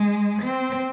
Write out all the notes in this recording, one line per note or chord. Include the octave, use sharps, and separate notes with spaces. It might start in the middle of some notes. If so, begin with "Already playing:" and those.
Already playing: G#3
C4